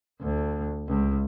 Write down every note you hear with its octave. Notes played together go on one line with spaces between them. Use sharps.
D2
C#2